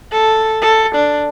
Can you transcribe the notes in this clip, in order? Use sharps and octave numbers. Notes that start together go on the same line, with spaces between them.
A4
A4
D4